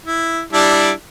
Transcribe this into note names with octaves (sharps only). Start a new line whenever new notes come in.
E4
G3 D4 E4